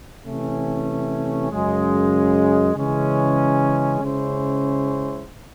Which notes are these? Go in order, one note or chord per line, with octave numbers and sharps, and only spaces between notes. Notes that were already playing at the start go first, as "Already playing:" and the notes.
C3 E3 A3 C#4
F#2 C#3 G#3
C#3 E3 G#3 C#4
C#3 G#3 C#4 E4 C5